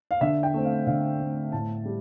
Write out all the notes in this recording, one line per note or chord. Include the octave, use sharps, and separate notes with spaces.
F5
D3 E5
G5
A3 C4
F5
D3 F5
A3 C4
A2 A5
G3